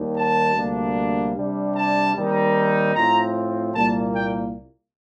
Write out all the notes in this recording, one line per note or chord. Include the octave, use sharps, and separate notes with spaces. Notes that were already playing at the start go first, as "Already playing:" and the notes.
Already playing: D#2 D#3 G3
A5
D2 C3 G3 A#3 D4
C3 G3 D4
A5
D#2 D#3 G3 C4 D#4
A2 F3 C4 A#5
C2 A#2 G3 A#3 A5
G5